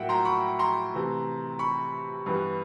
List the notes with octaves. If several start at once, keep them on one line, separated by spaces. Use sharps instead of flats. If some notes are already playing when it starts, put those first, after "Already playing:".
Already playing: A2 F#3 A#3 E5 F#5 G5
A#5 C6
B5 C#6
A#5 C6
C3 E3 A3
B5 C#6
G2 E3 G3 B3